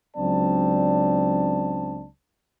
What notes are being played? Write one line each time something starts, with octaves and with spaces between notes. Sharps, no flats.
C#2 F#3 C4 D4 D5 A5